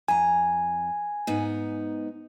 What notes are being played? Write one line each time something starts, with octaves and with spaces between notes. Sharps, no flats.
F2 G#5 A#5
G#2 B3 D#4